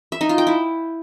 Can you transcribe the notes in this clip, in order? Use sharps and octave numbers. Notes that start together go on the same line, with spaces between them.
E5
D#4
F4
G5
E4